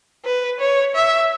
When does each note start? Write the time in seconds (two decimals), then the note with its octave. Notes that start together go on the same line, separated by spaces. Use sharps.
0.25 B4
0.60 C#5
0.95 E5